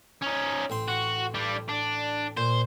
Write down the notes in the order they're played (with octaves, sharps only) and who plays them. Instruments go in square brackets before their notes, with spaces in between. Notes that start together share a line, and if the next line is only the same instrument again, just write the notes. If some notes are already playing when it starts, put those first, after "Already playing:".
[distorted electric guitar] C#4 D#4
[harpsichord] A1 C4 C6
[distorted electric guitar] F#4
G3 D4
D4
[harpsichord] A#2 [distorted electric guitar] C5